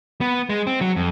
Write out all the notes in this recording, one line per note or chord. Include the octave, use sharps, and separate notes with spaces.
B3
G#3
C4
F#3
F2